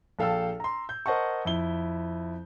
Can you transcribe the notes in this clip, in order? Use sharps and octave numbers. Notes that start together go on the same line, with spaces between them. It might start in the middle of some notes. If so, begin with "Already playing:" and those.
A#1 A4 F5 G5 A5 E6
A#5 C6
G6
A#4 C5 D#5 F#5 A5 C#6
F2 E4 G7